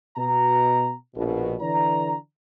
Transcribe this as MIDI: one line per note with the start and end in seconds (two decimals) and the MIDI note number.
0.17 0.92 47
0.17 0.92 82
1.15 1.55 34
1.15 1.55 47
1.61 2.14 50
1.61 2.14 52
1.61 2.14 74
1.61 2.14 82